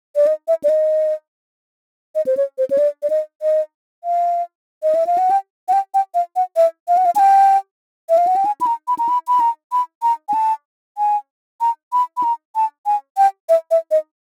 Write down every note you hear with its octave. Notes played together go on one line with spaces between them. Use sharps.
D5
D#5
E5
D5
D#5
D#5
C5
C#5
C5
C#5
D5
D5
D#5
D#5
F5
D#5
E5
F5
F#5
G5
F#5
G5
G5
F5
F#5
E5
F5
F#5
F5
G#5
G5
E5
F5
F#5
G5
G#5
B5
A#5
B5
A#5
B5
B5
A#5
B5
A#5
G#5
A5
G#5
A#5
B5
B5
A#5
A5
G#5
G5
E5
E5
D#5